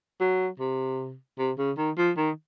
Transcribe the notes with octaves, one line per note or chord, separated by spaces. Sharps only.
F#3
C3
C3
C#3
D#3
F3
D#3